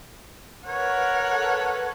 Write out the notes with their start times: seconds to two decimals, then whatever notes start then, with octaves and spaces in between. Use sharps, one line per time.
0.67 A#4 B4 C#5 F#5
1.29 A4 B4